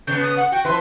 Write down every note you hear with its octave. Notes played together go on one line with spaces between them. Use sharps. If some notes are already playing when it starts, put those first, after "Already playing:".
C#3 B3 G6
D#6
F#5
F#4 G5
F3 E4 B4 C6